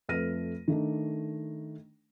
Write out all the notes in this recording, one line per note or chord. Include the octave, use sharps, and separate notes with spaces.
F2 A3 B4 F6 A#6 D#7
D#3 A3 D4